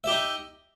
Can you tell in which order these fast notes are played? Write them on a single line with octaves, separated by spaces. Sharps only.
E5 G4 D#4